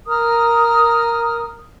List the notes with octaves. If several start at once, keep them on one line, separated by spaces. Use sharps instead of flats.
A#4 A#5 D#6 F6